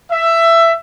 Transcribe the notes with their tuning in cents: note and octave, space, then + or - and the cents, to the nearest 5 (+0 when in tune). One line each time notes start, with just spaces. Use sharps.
E5 +15